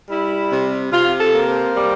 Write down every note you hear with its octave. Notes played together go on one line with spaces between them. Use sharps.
G3 E4
C3
C3 F4
A4
A#3
C5
G3